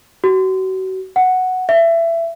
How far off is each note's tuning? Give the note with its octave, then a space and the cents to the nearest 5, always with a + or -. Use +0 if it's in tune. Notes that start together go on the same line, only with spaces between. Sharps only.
F#4 +35
F#5 +0
E5 +20